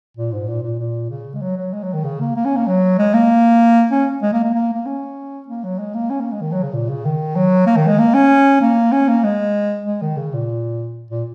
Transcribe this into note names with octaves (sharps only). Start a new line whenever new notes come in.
A#2
G#2
A#2
A#2
A#2
C#3
G#3
F#3
F#3
G#3
F#3
D#3
C#3
A#3
A#3
C#4
A#3
F#3
G#3
A#3
C#4
G#3
A#3
A#3
A#3
A#3
C#4
A#3
F#3
G#3
A#3
C#4
A#3
G#3
D#3
F#3
C#3
A#2
C#3
D#3
F#3
A#3
D#3
G#3
A#3
C#4
A#3
C#4
A#3
G#3
G#3
D#3
C#3
A#2
A#2